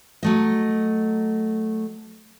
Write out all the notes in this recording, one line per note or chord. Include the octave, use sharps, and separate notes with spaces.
F#3 A3 D#5